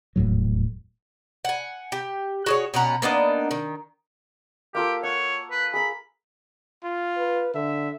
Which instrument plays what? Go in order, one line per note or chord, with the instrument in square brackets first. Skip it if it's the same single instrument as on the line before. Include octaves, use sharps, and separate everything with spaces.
[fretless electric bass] D#1 E2 A2 F#3
[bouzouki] F#5 G#5
G4
F#4 G#4 C#5
B2 C#4 F#5 A#5
A#3 B3 D4 D#4
D#3
[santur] A#3 F4 A4 [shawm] G4
[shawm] C#5 [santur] F#5
[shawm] B4
[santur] G#4 A#5 [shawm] B5
[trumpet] F4
[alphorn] B4
[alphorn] D3 [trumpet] E5